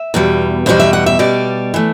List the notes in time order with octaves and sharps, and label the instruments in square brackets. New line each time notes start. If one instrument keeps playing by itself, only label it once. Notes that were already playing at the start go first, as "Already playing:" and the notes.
Already playing: [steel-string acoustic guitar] E5
E2 B2 G3
E2 B2 G3 C5
E5
F#5
E5
B2 G3 D5
E3 A3